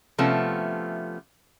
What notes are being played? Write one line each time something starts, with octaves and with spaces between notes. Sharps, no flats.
C3 F3 A3 B3 C#4